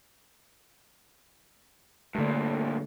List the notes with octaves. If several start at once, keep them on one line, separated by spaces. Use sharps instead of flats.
G2 A#2 D3 A3